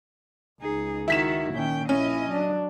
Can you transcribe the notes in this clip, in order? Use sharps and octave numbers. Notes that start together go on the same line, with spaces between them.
C#2 D#4 G#4
D#3 E4 F#4 B6 E7
A#2 D#3 C#4 G5
A#1 C#4 E4 D#5
F#3 D4